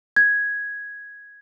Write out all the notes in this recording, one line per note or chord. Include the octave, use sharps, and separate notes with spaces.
G#6